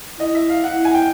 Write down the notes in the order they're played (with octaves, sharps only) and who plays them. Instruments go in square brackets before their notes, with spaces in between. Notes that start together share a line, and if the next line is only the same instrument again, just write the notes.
[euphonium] E4 [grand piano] D#5
[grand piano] E5
F5
[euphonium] E4 [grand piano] F#5
[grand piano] G#5
G5